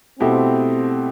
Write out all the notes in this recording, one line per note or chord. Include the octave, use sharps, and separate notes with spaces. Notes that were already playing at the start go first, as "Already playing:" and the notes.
B2 A3 C4 E4 G4